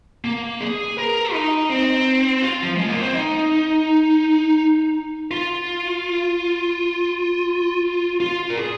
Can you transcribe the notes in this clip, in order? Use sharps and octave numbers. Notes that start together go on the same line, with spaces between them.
A#3
G#4
A#4
D#4
C4
F4
F3
G#3
A#3
C4
D#4
F4
F4
A#4
G#4